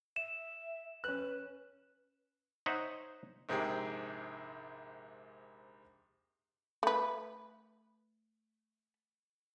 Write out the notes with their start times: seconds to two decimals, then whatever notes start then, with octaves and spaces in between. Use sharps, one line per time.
0.16 E5 E7
1.04 C#4 B4 F#6
2.66 D#4 C5 C#5 E5 F#5
3.49 A#1 G#2 C3 G#4 G5
6.83 A3 B4